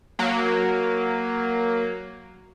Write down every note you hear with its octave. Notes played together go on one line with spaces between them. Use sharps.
F#3 A#3